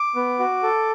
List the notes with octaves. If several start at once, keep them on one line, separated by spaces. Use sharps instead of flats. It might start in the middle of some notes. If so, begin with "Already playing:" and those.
Already playing: D6
B3
F#4
A4